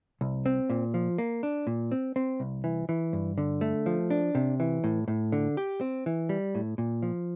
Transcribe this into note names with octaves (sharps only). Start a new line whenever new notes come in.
C2
C4
A#2
F3
A#3
D4
A#2
C4
C4
C2
E3
E3
G2
D3
A3
F3
D4
C3
E3
A2
A2
D3
G4
C4
E3
G3
A2
A#2
F3